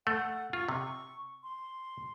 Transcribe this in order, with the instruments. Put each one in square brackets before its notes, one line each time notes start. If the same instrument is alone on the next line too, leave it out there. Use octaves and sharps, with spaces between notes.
[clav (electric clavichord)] A3 [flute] F#5
[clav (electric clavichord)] F4 [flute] C#6
[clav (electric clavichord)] C3
[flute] C6